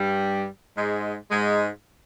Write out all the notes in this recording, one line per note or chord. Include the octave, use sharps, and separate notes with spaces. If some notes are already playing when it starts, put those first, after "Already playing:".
Already playing: G2 G3
G#2 G#3
G#2 G#3